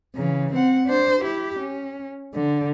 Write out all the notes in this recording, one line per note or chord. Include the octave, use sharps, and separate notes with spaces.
C#3 E3
C4 F#5
D4 C5
E4 G4
C#4
D3